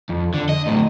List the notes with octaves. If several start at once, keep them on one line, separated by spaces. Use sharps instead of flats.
F2
D3
D#5
D2 A2